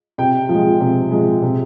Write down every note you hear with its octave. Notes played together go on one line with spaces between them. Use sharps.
C3 G5
F3 G#3
C3
F3 G#3
C3